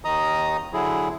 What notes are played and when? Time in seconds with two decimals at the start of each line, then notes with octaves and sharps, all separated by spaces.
0.05 D#2 D#3 D#5 A#5 D#6
0.73 D3 F#3 E4 G#4